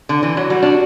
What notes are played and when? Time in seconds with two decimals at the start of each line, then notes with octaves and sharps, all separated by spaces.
0.09 D3
0.23 E3
0.37 F#3
0.50 G3 F#4
0.63 D4